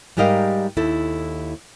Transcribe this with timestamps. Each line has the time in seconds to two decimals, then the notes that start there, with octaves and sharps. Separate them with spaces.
0.17 G#2 G3 G4 A#4 D#5 F5
0.77 D#2 E4 A4